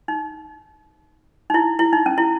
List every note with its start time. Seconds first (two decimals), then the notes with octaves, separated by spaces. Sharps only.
0.08 D#4
1.50 D#4
1.54 E4
1.79 E4
1.93 D#4
2.06 C#4
2.18 E4